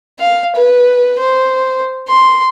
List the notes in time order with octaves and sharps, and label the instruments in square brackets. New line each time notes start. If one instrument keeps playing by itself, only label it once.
[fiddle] F5
B4
C5
C6